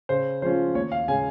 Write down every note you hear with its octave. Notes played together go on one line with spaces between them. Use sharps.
C#3 C5
F3 G#3 C#4 F4 C5
D#2 C#5
F5
C#3 G#3 C#4 G#5